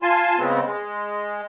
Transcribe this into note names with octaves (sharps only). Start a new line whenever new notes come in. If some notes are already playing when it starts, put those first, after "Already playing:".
F4 G#5 A5 C6
C#3 G#3 B3 C4
G#3